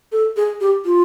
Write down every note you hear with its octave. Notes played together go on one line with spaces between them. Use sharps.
A4
G#4
G4
F4